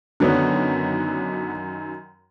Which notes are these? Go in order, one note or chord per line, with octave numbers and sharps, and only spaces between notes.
F#2 D3 D#3 F#3 B3 C#4